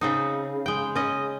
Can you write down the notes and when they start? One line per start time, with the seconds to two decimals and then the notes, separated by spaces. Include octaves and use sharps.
0.01 C#3 C4 D#4
0.66 G#3 G5
0.95 C#4 D#5